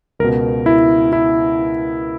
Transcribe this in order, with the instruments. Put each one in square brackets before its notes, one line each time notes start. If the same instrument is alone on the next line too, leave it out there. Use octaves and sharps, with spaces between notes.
[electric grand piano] C#2 A#4
B2
E4
E4